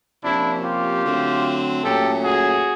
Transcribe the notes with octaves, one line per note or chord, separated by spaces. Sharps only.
C3 F3 A#3 C#4 D4 E4
F4 G4
D3 F#3 A3 C4
A#2 F#3 A3 C#4 G4 A4
F#4 G#4